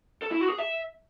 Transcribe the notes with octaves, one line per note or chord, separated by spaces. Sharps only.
A4
E4
F#4
G#4
E5